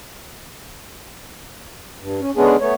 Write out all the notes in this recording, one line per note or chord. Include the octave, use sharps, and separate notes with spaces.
G2
C#4
D3 G#3 B3 C#4 D4 G#4
A3 B3 C#5